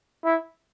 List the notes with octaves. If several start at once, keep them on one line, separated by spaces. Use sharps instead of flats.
E4